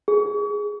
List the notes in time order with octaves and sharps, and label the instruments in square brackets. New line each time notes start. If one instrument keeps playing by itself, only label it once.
[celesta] G#4